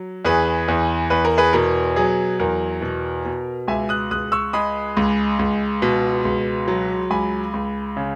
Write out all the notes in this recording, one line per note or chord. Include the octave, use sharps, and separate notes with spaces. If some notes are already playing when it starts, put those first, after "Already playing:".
Already playing: F#3
E2 G#4 B4
E2
E2 B4
A#4
G#4 B4
B2 A#4
F#3 G#4
E2 A#4
B2
B2
C#2 E5 G#5
D#6 F#6
C#2 D#6 F#6
C#6 E6
G#3 B5 D#6
C#2
C#2
B2
C#2
F#3
C#2 G#5 B5
C#2
C#3